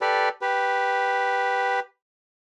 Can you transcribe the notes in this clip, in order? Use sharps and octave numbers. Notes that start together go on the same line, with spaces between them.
G4 A4 B4 D5
G4 B4